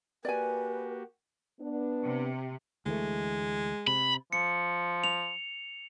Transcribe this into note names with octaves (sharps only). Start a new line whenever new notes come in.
A#3 F#4 G4 B4 D5 G#5
B3 D4
C3
D2 E3 G#3 A3
C3 B5
F3 C#7
F7